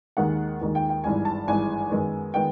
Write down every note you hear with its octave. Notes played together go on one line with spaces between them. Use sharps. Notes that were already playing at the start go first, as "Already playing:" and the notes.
D#2 D#3 G#3 F#5
D#2 D#3 G#3
G5
G5
G#1 G2 E3 G#3 G#5
A5
G#1 G2 E3 G#3 G#5
F#2 D#3 G#3 B3
D#3 G#3 B3 G5